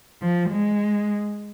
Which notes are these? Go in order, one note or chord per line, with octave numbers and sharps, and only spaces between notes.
F3
G#3